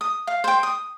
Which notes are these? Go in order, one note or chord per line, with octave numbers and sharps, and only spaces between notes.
D#6
F5
C5 G5
D#6